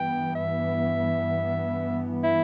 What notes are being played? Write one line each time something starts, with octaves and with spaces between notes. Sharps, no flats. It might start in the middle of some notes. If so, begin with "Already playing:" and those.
Already playing: G2 E3 B3 G5
E5
E4